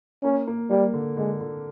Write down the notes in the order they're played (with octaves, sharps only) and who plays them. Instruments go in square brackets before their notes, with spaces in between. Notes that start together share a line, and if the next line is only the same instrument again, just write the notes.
[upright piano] A#3 [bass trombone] C#4
[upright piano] A#3
[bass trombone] G3 [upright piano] A#3
[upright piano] D3
[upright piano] D3 [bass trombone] G#3
[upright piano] D3